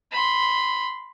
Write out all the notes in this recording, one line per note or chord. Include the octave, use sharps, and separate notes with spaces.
B5 C6